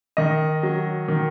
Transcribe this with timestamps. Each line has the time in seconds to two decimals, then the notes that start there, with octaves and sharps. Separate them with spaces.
0.17 D#3 D#5
0.63 F#3
1.08 D#3